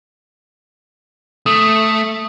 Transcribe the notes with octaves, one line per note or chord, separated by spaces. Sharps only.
A3 D#6